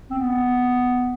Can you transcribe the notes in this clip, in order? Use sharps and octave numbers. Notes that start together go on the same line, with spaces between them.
C4
B3